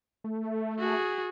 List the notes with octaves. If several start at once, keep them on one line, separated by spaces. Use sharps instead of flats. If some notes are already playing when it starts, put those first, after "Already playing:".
A3
F#4 G#4